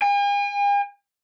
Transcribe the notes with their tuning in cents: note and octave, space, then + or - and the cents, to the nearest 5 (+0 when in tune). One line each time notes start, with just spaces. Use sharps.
G#5 -45